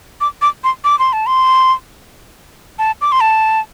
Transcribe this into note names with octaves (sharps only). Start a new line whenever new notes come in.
D6
D6
C6
D6
C6
A5
C6
A5
D6
C6
A5